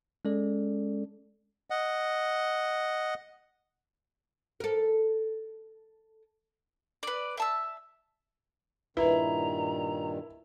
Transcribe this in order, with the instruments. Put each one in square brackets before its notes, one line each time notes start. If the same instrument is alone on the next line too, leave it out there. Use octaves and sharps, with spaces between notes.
[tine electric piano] G#3 C#4 A4 D5
[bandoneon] D#5 F#5
[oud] A4 A#4
[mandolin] B4 D5
E5 A5 E6
[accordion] G2 A#2 D#3 [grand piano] E4 [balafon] B4 [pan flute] A#5